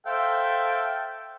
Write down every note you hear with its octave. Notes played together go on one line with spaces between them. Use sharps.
A4 C5 E5 F5 G5